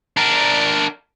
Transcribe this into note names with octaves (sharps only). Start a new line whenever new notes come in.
D4 A#4